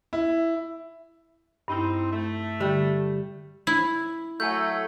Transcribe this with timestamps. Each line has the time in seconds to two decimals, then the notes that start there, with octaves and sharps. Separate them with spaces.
0.13 E4
1.68 G2 C4 D#4 E4
2.12 A3
2.60 D3 G3
3.67 E4
4.40 F#3 A3 G#5 G6